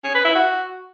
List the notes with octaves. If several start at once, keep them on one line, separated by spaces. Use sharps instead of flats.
C#4
B4
E4
F#4